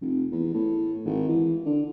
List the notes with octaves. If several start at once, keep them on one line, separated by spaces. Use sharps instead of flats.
F1
E2
A2
G#1
E3
D3